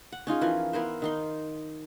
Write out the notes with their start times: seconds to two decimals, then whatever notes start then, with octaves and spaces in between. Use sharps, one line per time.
0.12 F#5
0.27 C#4 D#4 F4 G#4
0.41 E3 F3 A#4
0.73 B3 E4 A#4 C5
1.02 D#3 D#4 C6